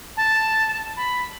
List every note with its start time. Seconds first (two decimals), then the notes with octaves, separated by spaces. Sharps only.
0.17 A5
0.97 B5